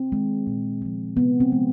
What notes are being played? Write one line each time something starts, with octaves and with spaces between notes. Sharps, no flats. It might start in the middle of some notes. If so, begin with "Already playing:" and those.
Already playing: C4
D#3 G#3
A#2
F3 G#3
C3 B3
C4
F3 G#3